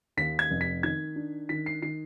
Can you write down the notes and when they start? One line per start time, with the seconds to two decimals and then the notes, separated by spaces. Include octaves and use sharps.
0.17 D#2 B6
0.39 G#6
0.51 F1
0.61 B6
0.83 D#3 G#6
1.16 D4
1.49 D#3 B6
1.66 C7
1.82 D#3 C7